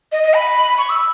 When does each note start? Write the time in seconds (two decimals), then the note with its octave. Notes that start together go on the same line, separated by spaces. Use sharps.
0.12 D#5
0.23 D#5
0.34 B5
0.78 C#6
0.90 E6